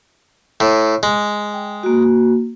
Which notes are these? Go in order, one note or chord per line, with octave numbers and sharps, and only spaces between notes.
A2
G#3
G5
A#3 F#4